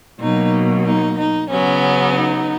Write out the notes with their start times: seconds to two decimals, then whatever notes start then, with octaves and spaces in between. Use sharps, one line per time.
0.20 B2 F#3 A#3 D#4
0.86 D#4
1.18 D#4
1.50 C#3 F#3 B3 C#4
2.16 D#4